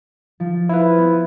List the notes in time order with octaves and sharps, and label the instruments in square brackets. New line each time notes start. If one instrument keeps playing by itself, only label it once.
[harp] F3
[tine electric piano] E4 B4 [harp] C5 F5
[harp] B3